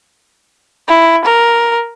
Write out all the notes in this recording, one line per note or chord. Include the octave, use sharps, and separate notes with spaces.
E4
A#4